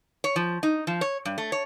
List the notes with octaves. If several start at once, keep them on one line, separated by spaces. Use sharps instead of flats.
C#5
F3
D#4
F3
C#5
G2
A3
C#5